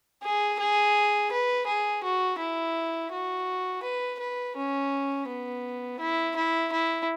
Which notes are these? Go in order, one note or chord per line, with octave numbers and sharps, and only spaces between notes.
G#4
G#4
B4
G#4
F#4
E4
F#4
B4
B4
C#4
B3
E4
E4
E4